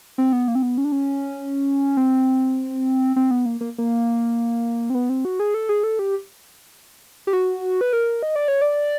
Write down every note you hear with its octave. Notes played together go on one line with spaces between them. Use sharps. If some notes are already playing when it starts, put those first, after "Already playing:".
C4
B3
A#3
C4
B3
C#4
D4
C#4
C4
C4
B3
A#3
A#3
A#3
C4
B3
C4
F#4
G#4
A4
G#4
A4
G4
G4
F#4
B4
A#4
D#5
D5
C#5
D5